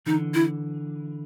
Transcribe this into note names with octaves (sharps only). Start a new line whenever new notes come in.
D3 E3 D#4
E4